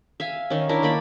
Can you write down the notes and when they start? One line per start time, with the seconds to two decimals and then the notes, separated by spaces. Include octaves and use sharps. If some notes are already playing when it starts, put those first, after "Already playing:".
0.20 E5 F5 G#5
0.50 D#3 C#4
0.69 C#4 D4 E4 A#4
0.82 D#3 A#3 D5 B5